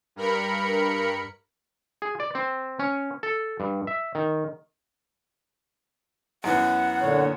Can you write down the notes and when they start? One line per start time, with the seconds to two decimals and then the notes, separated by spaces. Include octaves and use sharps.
0.16 G2 A#4 B5 C#7
2.02 G#4
2.20 D5
2.35 C4
2.79 C#4
3.23 A4
3.60 G2
3.87 E5
4.15 D#3
6.44 F#2 E3 B3 F#5
7.01 A#2 D3 C#5